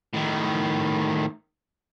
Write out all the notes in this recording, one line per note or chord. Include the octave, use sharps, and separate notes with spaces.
A2 D#3